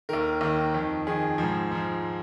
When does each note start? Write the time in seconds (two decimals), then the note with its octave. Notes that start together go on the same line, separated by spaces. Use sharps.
0.09 D#2 D#3 A#4
0.41 D#2 D#3
0.74 F2 D#3
1.07 F2 D#3 G#4
1.38 G#2 F3
1.72 G#2 F3